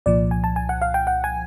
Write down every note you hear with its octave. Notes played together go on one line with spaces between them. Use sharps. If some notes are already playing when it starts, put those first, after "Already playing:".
C2 A#2 F3 D5
G#5
A5
G#5
F#5
F5
G5
F#5
G#5